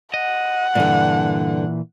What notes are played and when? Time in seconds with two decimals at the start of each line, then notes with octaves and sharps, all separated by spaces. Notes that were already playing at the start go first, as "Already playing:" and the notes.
0.14 D#5 F#5
0.75 G2 A#2 D3 E3